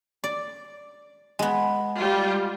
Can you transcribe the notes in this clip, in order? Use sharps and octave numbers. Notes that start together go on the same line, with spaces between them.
D5
G#3 B3
G3 F4